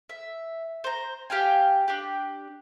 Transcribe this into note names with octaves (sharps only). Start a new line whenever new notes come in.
E5
C5 A#5
G4 F5 G5 G#5
D4 G4